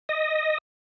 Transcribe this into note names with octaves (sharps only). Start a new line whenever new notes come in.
D#5